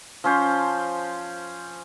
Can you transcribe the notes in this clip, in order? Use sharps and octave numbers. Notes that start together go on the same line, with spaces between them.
F3 C#4 C5